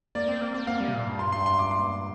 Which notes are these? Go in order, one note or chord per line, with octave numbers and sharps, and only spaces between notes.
A#3 D5
C4
A#3
C4
A#3 F5
G3
C3
A#2
G2
C6
C6
C6
D6
C6